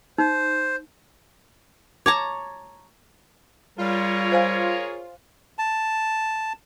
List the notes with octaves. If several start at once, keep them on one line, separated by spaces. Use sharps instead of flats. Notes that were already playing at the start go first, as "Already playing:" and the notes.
D#4 C5
C#5 A5 A#5 D6 G#6
G3 F4 G#4 A#4 C#5
C5 F5 G#5
A5